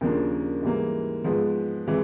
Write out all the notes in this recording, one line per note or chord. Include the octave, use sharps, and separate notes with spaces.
D#2 C#3 F3 A#3 D4
G#2 E3 G3 A#3
G#2 F3 G#3 B3
C3 E3 G#3